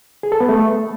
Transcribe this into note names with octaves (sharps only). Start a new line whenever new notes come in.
G#4
A4
B3
A3